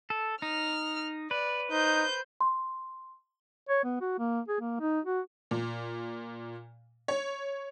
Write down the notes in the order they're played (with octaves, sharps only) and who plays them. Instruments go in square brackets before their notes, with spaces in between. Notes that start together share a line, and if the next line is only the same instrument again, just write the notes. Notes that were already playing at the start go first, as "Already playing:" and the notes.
[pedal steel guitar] A4
[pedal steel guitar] D#4 [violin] F6
[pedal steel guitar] B4 [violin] D5
[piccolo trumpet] D#4 [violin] C5 G6
[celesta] C6
[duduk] C#5
B3
F#4
A#3
G#4
A#3
D#4
F#4
[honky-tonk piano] A#2
C#5